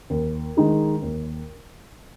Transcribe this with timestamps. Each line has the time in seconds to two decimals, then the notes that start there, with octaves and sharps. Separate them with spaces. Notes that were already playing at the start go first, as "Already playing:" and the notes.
0.10 D#2
0.57 D#3 G#3 D#4 G#4
1.02 D#2